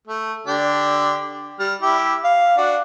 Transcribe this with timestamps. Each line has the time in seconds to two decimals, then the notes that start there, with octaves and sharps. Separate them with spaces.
0.07 A3
0.47 D3 D4 G4
1.59 G3 F6
1.82 E4 G4
2.24 F5
2.58 D4 F#4